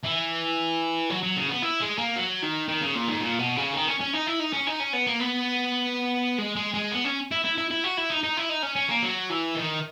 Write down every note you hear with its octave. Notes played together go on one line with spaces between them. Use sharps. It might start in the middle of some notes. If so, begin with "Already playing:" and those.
E3
F#3
F#3
C#3
B3
E4
G#3
A#3
F#3
D#3
D#3
C#3
A#2
G#2
A#2
B2
C#3
D#3
C#4
C#4
D#4
E4
D#4
C#4
D#4
C#4
B3
A#3
B3
G#3
G#3
G#3
B3
C#4
E4
E4
E4
E4
F#4
E4
D#4
D#4
E4
D#4
C#4
C#4
A#3
F#3
E3
D#3